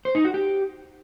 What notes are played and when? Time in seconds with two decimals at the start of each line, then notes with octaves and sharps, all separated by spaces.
0.05 C5
0.15 D#4
0.24 F#4
0.34 G4